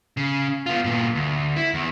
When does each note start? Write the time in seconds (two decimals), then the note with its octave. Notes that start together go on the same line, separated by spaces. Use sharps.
0.17 C#3
0.66 B3 F4
0.84 G2 A#2
1.15 D2
1.56 E4
1.74 E2